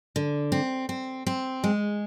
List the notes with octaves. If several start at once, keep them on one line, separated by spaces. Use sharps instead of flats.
D3
C4
C4
C4
G#3